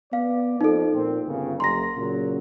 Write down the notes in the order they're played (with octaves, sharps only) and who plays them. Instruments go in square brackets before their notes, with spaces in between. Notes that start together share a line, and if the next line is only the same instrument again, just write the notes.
[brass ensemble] B3 D5 [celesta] F5
[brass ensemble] F2 [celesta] D#4 A4
[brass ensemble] A#2 A#3 C4
G1 C#3
[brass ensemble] F#1 A#5 [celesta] C6 A#6
[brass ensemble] A#2 C#3 F#3